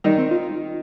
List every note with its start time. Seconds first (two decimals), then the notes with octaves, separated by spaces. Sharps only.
0.04 D#3 G3 D#4
0.18 C4
0.31 F4